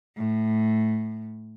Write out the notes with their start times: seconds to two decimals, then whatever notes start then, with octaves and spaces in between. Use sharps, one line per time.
0.17 A2